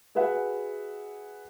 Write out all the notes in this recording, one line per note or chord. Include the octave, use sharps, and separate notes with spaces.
F#4 G#4 B4 E5 F#5